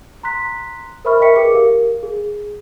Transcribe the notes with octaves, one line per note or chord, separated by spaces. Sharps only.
A#5 C6 F#6 B6
A#4 C5 E5 B5 C#6 F6
A#4 D#5 E5 G5 B6 C#7
G#4 A#4 B4 D6 C#7
G4 A#4 F5
G#4